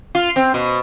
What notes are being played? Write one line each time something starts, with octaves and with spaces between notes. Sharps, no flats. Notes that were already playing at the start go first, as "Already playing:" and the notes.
F4
C4
B2